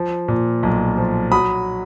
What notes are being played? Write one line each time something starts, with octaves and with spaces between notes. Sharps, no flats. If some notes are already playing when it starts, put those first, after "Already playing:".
Already playing: F3
A#2
B1
F3
F#3 B5 D#6